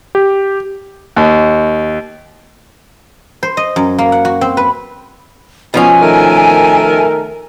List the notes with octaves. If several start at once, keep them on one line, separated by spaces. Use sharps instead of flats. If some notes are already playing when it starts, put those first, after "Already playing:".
G4
D#2
C5
D#5
F#2
A#3
F#5
F#4
C4
B4
B2 F3 C#4 G#5
D#3 A3 A#4